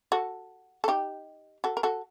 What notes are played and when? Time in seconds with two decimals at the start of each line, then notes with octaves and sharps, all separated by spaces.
0.12 F#4 A4
0.84 A4
0.88 D#4 G4
1.64 F#4 A4
1.77 A#4
1.83 F#4 A4